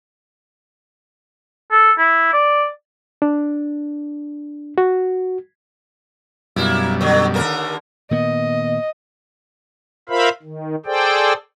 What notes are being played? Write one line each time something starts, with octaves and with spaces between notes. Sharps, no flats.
A4
E4
D5
D4
F#4
F#2 B2 G3 A#3 E4
D3 F#3
D#2 D3 A#4
A#2 D#3 B3 D#5
F4 A#4 C5 E5 F5 B5
D#3
G#4 A4 C5 D5 G5